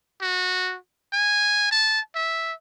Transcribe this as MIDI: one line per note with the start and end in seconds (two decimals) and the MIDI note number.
0.22 0.77 66
1.13 1.68 80
1.71 2.00 81
2.15 2.53 76